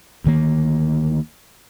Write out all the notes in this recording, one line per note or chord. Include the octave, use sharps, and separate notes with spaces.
D2 D#3 A#3